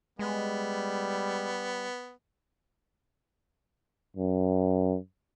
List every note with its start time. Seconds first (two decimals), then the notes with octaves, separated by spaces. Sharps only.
0.19 G3 G#3 B3
4.17 F#2